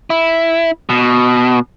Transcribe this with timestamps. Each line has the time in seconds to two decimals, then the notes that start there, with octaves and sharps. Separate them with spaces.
0.10 E4
0.89 B2